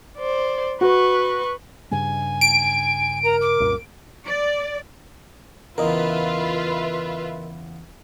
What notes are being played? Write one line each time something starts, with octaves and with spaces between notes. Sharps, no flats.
C5 D5
F#4 B4 C#6
G2 C#3 G3 G#5
D7
A#4 A#5
D6
C2 F#2 A#2
D5
E2 C#3 F4 A#4 B4 D#5 E5